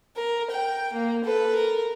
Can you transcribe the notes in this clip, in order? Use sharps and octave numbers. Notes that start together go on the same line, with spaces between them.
A#4
G5
A#3
A4 B4
A#4